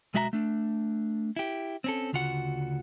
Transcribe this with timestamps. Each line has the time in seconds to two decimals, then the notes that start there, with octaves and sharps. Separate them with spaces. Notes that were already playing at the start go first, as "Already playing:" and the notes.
0.14 B1 G#3 F#4 E5 F5 A#5
0.33 A3 D4
1.36 E4 G4
1.84 C4 C#4 A4
2.13 D2 C#3 F4 F#4 F#5